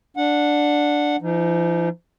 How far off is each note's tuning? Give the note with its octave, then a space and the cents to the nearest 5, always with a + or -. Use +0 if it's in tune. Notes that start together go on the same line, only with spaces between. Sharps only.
D4 +0 F#5 -15
F3 -40 D#4 +0